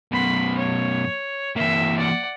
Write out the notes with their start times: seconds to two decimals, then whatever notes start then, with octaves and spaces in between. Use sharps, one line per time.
0.12 F#2 B2 B5 C6
0.57 C#5
1.56 E3 A#3 E5
1.98 D5 F#5